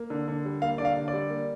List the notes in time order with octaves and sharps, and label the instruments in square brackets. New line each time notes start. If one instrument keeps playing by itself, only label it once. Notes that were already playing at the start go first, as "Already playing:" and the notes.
Already playing: [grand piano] A#3
D3
D3
G3
A#3 F5
D3 D5
F5
D3
D5
G3
A#3